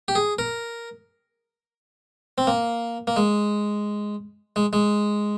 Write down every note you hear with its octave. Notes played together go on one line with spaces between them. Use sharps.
G4
G#4
A#4
C4
A#3
A#3
G#3
G#3
G#3